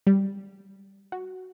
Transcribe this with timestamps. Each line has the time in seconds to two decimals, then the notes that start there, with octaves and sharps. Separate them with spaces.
0.07 G3
1.12 F#4